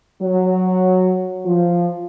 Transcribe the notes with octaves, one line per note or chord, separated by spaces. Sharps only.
F#3
F3